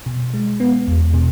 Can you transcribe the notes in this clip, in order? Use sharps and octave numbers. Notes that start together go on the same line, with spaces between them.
B2
G#3
B3
E2
B2